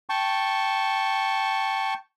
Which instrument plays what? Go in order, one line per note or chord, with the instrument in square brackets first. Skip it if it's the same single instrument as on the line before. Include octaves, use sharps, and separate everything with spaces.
[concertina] G5 A5 C#6